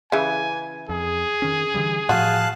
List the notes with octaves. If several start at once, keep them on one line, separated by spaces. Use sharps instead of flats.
C#3 E3 G#5
F2 G#4
D#3 C#4
D3 E3 G3
A2 F3 F#4 F5 A5 F#6